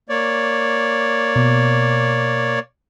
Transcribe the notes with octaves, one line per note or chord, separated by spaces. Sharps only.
A#3 C#5 D5
B2